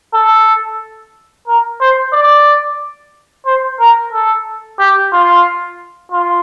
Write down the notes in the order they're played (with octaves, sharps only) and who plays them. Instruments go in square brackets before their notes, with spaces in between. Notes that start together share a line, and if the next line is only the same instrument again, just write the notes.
[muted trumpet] A4
A#4
C5
D5
C5
A#4
A4
G4
F4
F4